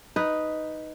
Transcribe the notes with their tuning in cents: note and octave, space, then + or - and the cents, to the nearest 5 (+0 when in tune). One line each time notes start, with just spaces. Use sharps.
D#4 +0 B4 +0